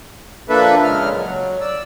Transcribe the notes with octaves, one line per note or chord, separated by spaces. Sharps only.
F3 A#3 D4 A4 B4 E5
A#2 C#3 G#3 F6
F#3
D5 E6